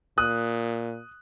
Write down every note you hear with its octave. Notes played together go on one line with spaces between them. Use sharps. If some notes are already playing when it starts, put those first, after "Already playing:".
A#2 D#6 F#6